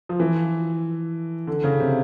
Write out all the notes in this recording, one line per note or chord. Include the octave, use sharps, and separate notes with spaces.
F3
E3
D3
C#3
C3